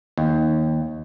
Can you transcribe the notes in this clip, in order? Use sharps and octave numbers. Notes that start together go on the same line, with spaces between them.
D#2